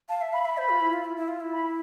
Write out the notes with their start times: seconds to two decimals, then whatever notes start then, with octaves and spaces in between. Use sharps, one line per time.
0.09 F5 A5
0.21 E5
0.33 F5 B5
0.45 E5 B5
0.57 C5 B5
0.69 F4
0.81 E4
0.93 F4
1.05 E4
1.17 E4
1.28 F4
1.41 E4
1.53 B5